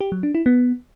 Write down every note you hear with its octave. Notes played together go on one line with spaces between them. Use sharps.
G4
F#3
D4
E4
B3